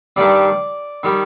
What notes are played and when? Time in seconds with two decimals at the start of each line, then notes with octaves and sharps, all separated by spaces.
0.16 G2 D#3 G3 D5
1.03 D#3 G3